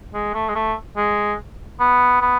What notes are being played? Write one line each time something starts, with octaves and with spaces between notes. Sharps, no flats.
G#3
A3
G#3
A3
G#3
B3
B3